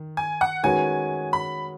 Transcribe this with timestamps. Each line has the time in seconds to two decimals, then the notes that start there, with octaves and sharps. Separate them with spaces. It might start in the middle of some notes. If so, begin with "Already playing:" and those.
Already playing: D#3
0.17 G#5
0.41 F#5
0.63 D#3 G#3 C#4 F#4 B4 G#5
1.33 B5